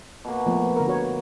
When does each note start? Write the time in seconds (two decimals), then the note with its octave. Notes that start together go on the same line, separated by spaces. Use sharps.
0.25 B2 A#3
0.46 F3 A3 B3
0.76 D3 A#4
0.88 F#4 C#5